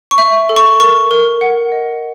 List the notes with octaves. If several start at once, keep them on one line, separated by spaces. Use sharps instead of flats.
C#6
E5
A4
C#6
A#4 C#6
A#4
F#5
D#5